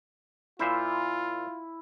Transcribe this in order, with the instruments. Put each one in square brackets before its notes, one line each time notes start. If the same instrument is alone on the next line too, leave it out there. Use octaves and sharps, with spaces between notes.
[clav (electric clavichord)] A#2 C5 E5 [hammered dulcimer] E4 [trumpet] F4